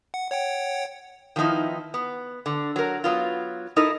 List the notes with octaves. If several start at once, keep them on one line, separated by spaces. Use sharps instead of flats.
F#5
C#5 F#5 G5
D#3 F3 B3 C4 D#4 E4
B3
D3
F#3 A#4
F#3 B3 F4
D#4 E4 A4 A#4 D#5